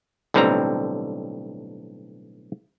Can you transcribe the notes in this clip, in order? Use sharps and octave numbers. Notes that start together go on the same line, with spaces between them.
B1 A2 D3 G3 C4 A#5